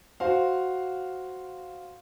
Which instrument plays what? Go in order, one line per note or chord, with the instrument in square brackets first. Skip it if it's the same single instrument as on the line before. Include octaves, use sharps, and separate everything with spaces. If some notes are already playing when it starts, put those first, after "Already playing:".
[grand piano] F#4 C5 F5